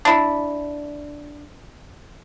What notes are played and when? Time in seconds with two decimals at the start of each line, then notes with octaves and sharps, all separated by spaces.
0.05 D4 E4